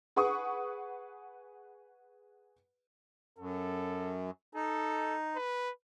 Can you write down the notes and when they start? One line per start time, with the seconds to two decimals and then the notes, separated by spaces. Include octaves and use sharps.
0.16 G#4 B4 F#5 C#6 D#6
3.38 F#2 A4
4.55 D#4 A4
5.36 B4